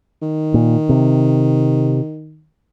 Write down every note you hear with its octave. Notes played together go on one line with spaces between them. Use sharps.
D#3
A#2
C3